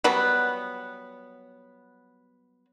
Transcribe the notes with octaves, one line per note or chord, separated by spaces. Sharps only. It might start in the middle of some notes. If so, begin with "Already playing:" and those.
F#3 G3 B3